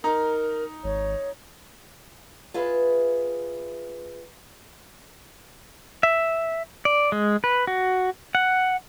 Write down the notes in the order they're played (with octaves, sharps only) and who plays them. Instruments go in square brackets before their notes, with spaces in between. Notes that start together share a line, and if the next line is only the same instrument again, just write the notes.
[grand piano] D#4 A#5 [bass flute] A#4
[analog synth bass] G#1 [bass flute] C#5
[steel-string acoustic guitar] F4 G#4 B4 E5
[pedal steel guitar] E5
D5
G#3
B4
F#4
F#5